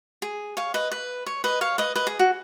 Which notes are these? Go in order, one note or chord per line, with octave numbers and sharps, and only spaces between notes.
G#4
C#5 F5
B4 D#5
B4
C#5
B4 D#5
C#5 F5
B4 D#5
B4 D#5
G#4
F#4